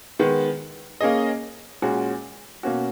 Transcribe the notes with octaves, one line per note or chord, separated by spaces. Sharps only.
D#3 G#3 B3
A#3 C#4 G#4 D#5
A#2 G#3 C#4 F#4
B2 A#3 C#4 F#4